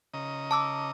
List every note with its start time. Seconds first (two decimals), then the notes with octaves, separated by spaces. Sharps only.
0.14 C#3 D#5 A#5
0.51 A5 D6 E6